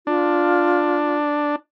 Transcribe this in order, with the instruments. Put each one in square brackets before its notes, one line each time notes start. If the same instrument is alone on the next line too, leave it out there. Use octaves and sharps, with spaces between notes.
[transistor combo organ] D4 [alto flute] F4